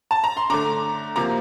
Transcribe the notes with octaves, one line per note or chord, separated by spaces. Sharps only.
A5
A#5
C6
D3 A3 A#5 D6
C3 F3 A#3 A#5 D6